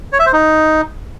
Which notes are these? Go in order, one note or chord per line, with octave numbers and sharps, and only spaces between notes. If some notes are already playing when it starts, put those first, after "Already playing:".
C#5
E5
C5
D#4